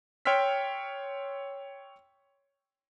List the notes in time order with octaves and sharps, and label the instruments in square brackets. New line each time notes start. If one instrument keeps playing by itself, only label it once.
[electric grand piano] C#5 G5 C6 E6 F6 B6